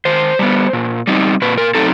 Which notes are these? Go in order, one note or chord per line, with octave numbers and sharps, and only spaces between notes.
D#3 C5
G3 B3
A#2
G3 C4 D#4
A#2 B4
A#4
F#3 A3 C4 D#4 A4